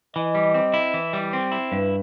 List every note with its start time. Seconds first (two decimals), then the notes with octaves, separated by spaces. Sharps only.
0.15 E3 D#5
0.35 G3
0.54 C4
0.74 E4
0.94 E3
1.13 G3
1.33 C4
1.52 E4
1.71 G2 B4